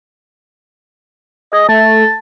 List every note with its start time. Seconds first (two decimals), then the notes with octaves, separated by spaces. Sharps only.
1.53 G#4 D#5
1.69 A3 A5